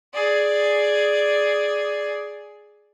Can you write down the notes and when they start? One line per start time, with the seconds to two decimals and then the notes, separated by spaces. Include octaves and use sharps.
0.14 G#4 D5